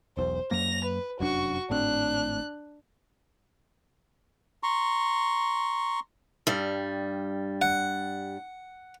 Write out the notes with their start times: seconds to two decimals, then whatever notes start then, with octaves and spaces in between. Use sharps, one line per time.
0.17 E1 B1 E2 C5
0.51 F#2 F#3 A#3 A#6 F7
0.84 B4
1.20 F1 F#2 D4 F#4 C#6
1.70 G#1 A2 C4 D4 F#6
4.63 A#5 C6 C#6
6.47 G2 G3
7.62 F#5